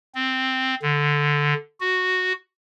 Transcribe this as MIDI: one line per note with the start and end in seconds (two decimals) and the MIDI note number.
0.15 0.75 60
0.82 1.54 50
1.80 2.33 66